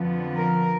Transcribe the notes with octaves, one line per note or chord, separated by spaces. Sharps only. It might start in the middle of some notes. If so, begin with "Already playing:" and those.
Already playing: F2 D3 F3 B3
A#4